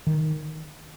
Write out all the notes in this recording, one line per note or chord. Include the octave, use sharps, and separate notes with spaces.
D#3